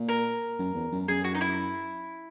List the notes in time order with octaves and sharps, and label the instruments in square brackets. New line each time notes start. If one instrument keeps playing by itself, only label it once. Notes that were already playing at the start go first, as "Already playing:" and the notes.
Already playing: [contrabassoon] A#2
[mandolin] A#4
[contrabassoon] F#2
E2
F#2
[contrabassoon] F#2 [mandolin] G#4
[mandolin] F#4
D#4
E4